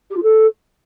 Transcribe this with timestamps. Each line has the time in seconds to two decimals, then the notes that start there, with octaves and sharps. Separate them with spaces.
0.10 G4
0.16 F4
0.23 A4